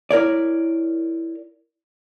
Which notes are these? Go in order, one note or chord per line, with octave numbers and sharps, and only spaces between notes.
E4 A#4 C#5 D5